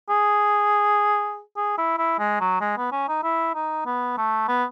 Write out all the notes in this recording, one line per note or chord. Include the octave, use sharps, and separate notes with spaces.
G#4
G#4
E4
E4
G#3
F#3
G#3
B3
C#4
D#4
E4
D#4
B3
A3
B3